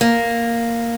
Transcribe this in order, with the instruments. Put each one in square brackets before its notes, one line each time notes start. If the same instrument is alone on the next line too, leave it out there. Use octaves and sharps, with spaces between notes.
[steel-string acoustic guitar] A#3